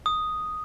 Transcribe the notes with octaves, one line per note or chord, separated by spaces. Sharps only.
D#6